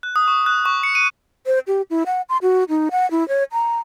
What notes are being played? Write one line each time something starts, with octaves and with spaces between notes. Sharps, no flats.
F#6
D#6
C#6
F#6
C#6
C#7
D#7
C5
G4
E4
F#5
C6
F#4
D#4
F#5
E4
C#5
A#5